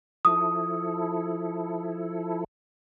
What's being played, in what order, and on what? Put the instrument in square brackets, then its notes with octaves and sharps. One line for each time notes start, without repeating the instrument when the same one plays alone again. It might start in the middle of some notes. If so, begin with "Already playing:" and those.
[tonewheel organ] F3 E4 A4 [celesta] D#6